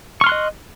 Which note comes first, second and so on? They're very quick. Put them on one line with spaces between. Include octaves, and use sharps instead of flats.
C#6 F6 C6 F#6 D#5